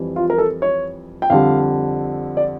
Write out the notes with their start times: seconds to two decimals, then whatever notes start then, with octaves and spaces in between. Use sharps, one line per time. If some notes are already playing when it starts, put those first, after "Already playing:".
Already playing: F2 E3 G3
0.16 F4
0.30 A#4
0.38 A4
0.62 C#5
1.22 G5
1.30 F2 D3 G3 F5
2.37 D5